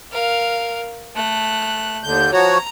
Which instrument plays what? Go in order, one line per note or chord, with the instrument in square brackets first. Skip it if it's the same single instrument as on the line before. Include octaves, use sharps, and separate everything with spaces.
[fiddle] A#4 F5
A3 F#6
[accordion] D#2 D3 G6
[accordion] F3 F#4 C#5 [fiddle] A#5